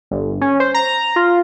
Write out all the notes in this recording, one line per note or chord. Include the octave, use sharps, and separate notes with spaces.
G1
C#4
C5
A#5
F4